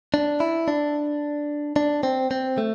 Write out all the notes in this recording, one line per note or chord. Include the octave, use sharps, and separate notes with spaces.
D4
E4
D4
D4
C4
C4
A3